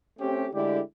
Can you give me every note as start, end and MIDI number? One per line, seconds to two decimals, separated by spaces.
0.20 0.47 57
0.20 0.47 60
0.20 0.47 61
0.20 0.47 67
0.53 0.80 50
0.53 0.80 56
0.53 0.80 57
0.53 0.80 62
0.53 0.80 64
0.53 0.80 67